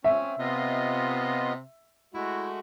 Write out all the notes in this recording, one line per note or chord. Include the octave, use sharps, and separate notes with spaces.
C4 C#4 E5
C3 B3 F4 D#5
G#3 A3 E4 F#4